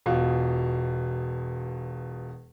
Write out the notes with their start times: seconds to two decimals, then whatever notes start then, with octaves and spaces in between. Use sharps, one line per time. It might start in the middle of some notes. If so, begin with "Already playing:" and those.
0.06 E1 B2 F4